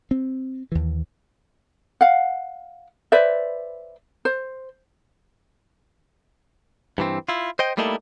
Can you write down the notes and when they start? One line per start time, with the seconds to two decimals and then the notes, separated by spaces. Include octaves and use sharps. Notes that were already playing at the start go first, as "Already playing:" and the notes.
0.11 C4
0.72 D#2 E3
2.01 F5 F#5
3.12 B4 C5 D5 E5
4.25 C5
6.98 G2 E3 C4
7.29 E4 F4
7.59 C5 D#5 G5
7.77 G3 A3 A#3 D#4 E4 A4